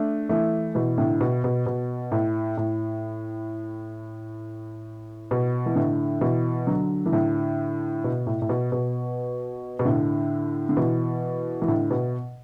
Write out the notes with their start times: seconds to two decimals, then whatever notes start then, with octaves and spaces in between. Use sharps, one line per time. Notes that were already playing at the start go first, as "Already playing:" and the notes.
Already playing: A3 D4
0.29 E3 A3
0.75 B2 E3
0.98 A2 D3
1.21 B2
1.44 B2
1.66 B2
2.12 A2
2.57 A2
5.31 B2
5.66 E3
5.76 A2 D3
6.21 B2 E3
6.67 D3 F#3
7.06 E3
7.12 A2 D3
8.04 B2
8.26 A2
8.42 A2
8.49 B2
8.72 B2
9.79 B2
9.85 A2 D3
10.69 D3
10.77 B2 E3
11.62 E3
11.68 A2 D3
11.91 B2